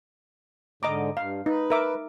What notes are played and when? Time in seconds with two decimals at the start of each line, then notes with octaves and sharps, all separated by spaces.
0.83 G#2 D3 D#5 A#5 D6
1.17 G2 F5
1.46 D#4 B4
1.70 A#4 E5 D6